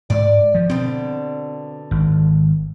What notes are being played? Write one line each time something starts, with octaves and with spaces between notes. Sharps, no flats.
G#2 D5
F3
B2 D3 C4
G#1